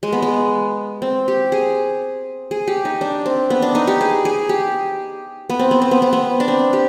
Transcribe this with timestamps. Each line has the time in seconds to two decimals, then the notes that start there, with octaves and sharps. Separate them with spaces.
0.03 G#3
0.12 B3
0.22 G#3
1.02 C4
1.28 G4
1.52 G#4
2.51 G#4
2.67 G4
2.85 D#4
3.01 D4
3.26 C4
3.50 B3
3.62 D4
3.75 D#4
3.87 G4
4.01 G#4
4.25 G#4
4.49 G4
5.50 B3
5.59 C4
5.71 B3
5.82 C4
5.91 B3
6.02 C4
6.13 B3
6.40 D4
6.48 C4
6.73 G4